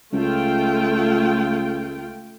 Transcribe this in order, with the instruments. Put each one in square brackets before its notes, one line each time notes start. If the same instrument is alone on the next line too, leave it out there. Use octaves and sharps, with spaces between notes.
[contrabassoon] C#2 [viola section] A3 F4 G5